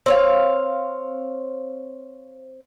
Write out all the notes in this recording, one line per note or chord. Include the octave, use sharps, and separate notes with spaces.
C4 C#5 F5